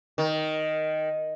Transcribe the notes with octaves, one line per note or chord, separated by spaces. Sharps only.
D#3